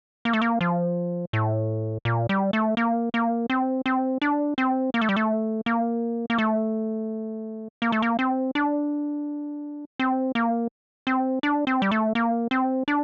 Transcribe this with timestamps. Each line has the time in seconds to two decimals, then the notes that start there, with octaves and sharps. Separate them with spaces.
0.25 A#3
0.33 A3
0.42 A#3
0.61 F3
1.33 A2
2.05 A#2
2.29 G3
2.53 A3
2.77 A#3
3.14 A#3
3.50 C4
3.86 C4
4.22 D4
4.58 C4
4.94 A#3
5.01 A3
5.09 G3
5.16 A3
5.66 A#3
6.30 A#3
6.38 A3
7.82 A#3
7.92 A3
8.02 A#3
8.19 C4
8.55 D4
9.99 C4
10.35 A#3
11.07 C4
11.43 D4
11.67 C4
11.82 G3
11.91 A3
12.15 A#3
12.51 C4
12.88 D4